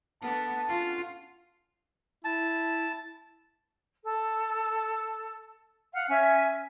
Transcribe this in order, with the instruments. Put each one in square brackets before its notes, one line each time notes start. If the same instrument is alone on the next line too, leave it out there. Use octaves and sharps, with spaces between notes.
[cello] B3 [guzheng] D4 A4 A#4 [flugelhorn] A5
[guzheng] C#4 F#4 [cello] F4
[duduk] E4 [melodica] A5
[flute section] A4
F5 F#5
C#4 E5 G#5 G#6